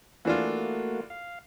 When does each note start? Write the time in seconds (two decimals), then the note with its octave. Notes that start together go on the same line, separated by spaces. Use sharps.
0.25 E3 A3 A#3 D4 F4 F#4
1.10 F5